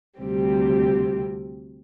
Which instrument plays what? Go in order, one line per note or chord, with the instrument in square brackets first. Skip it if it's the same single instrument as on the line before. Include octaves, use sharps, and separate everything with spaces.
[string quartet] D2 C3 G3 C4 G4